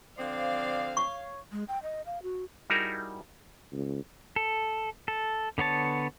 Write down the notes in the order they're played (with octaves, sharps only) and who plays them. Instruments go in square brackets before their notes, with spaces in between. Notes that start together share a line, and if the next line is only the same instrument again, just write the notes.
[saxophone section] D3 F3 C4 [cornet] D5 [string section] F5
[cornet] C#5 [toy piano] C#6
[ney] G#3
G5
D#5
F5
F#4
[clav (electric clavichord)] G3 D#4 E4 F#4 G#4 A#4
[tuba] C#2
[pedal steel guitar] A4
A4
D3 B3 C#5 A5